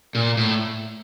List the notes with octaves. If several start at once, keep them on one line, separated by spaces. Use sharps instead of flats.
A#2
A2